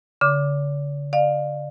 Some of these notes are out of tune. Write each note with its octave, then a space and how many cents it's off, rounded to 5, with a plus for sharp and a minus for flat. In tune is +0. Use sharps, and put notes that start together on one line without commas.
D3 -45 D6 +5
D5 +35 F5 +15